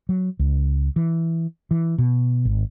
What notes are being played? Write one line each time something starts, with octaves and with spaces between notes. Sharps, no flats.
F#3
C#2
E3
E3
B2
G#1